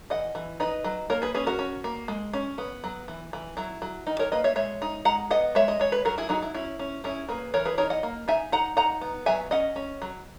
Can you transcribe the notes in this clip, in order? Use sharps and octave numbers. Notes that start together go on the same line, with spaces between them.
E3 D#5 F#5
E3
D#4 B4 D#5
F#3
A#3 A#4 C#5
G#4 B4
C#4 G#4 B4
F#4 A#4
C#4
A#3
G#3
C#4
B3
F#3
E3
E3
F#3 E4
F#3
D#3 D#4
A#4 C#5
A#3 B4 D#5
C#5 E5
G#3 C#5 E5
D#4
G#3 F#5 A#5
B3 D#5 F#5
G#3 C#5 E5
D#5
G#3 C#5
B4
F#3 F#4 A#4
E4 G#4
F#3 D#4 F#4
E4
C#4 E4
C#4
C#4 E4 G#4
A#3 G#4 B4
E3 A#4 C#5
G#4 B4
D#4 A#4 C#5
D#5 F#5
A#3
D#4 E5 G#5
D#4 F#5 A#5
D#4 F#5 A#5
B3
F#3 E5 G#5
C#4 D#5 F#5
C#4
F#3